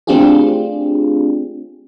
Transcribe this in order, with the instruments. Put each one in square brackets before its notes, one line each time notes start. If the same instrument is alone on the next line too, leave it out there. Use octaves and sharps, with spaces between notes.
[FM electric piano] A3 C4 D4 F4 G4 G#4